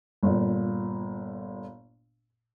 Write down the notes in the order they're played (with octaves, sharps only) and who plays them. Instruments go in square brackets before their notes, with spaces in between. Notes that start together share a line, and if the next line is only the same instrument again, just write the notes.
[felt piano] G1 A#2